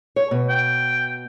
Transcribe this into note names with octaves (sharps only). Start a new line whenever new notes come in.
C#5
B2
G5